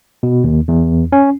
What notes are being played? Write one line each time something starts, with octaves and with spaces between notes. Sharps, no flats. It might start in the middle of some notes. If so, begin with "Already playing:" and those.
B2
D#2
E2
C#4